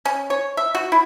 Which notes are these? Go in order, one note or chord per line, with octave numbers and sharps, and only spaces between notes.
C#4
C#5
E5
F#4
E4